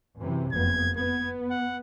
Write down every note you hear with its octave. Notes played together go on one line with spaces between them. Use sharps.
F#2 C3 E3
F#1 F2 B3 G#6
B3 G#6
F#5